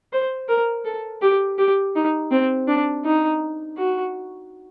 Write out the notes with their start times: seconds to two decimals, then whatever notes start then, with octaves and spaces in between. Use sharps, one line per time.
0.13 C5
0.48 A#4
0.85 A4
1.22 G4
1.59 G4
1.95 D#4
2.31 C4
2.68 D4
3.05 D#4
3.78 F#4